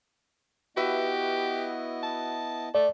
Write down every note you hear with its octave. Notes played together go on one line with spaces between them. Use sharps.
B3 E4 F#4 G4 B4 D#5 E5
A5
A3 D5